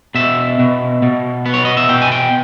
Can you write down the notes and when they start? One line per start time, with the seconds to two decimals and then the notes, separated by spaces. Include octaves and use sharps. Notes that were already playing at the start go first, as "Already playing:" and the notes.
0.15 B2 E5
0.59 B2
1.02 B2
1.46 B3
1.54 C#5
1.65 D#5
1.77 E5
1.89 B2 G5
2.02 G#5
2.12 G5